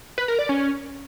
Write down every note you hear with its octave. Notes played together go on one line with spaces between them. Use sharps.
B4
A#4
D5
C#4